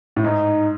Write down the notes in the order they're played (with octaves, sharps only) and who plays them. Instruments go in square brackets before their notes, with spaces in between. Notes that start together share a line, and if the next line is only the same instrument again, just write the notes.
[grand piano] A2
[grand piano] G#2 [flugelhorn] D#4